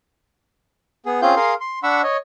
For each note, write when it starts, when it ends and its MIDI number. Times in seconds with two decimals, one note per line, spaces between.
1.06 1.21 59
1.06 1.21 68
1.22 1.35 60
1.22 1.35 61
1.22 1.35 65
1.22 1.35 68
1.22 1.35 77
1.22 1.35 91
1.36 1.54 68
1.36 1.54 70
1.36 1.54 77
1.36 1.54 84
1.61 1.79 84
1.83 2.02 62
1.83 2.02 78
1.83 2.02 83
1.83 2.02 85
1.83 2.02 88
2.03 2.17 73
2.03 2.17 75